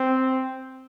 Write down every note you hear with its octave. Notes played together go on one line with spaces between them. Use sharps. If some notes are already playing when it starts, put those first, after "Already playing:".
Already playing: C4